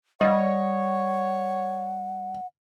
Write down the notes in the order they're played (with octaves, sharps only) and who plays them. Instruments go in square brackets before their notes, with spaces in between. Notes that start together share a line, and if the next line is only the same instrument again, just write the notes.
[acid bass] G3 [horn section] C#5 [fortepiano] D#5 [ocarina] F#5